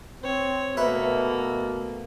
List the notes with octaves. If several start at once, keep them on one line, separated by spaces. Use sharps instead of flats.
C4 C#5
B2 A3 A#3 B4 E5